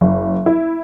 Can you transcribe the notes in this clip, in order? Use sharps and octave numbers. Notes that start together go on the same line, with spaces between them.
F#1
E4